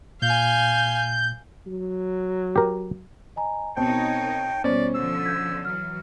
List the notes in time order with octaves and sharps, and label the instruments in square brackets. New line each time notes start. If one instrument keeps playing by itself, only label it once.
[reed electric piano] A#2 [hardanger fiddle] F5 G#5 [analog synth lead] G6
[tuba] F#3
[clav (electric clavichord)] G4 A#4
[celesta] D#5 G#5 A#5
[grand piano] B2 C4 [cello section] D#4 A#4 C#5 [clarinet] G5 [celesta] A5
[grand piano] B2 C#4 [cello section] G3 [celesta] C5 [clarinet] D5
[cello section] D3 F3 [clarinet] E6
[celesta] G6 G#6 B6
[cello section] E3 F#3 [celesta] F6